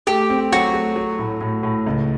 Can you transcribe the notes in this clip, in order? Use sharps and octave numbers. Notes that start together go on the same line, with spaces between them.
A3 G4
C4
F#3 F#4
A3
F#3
A2
A2
A2
C#2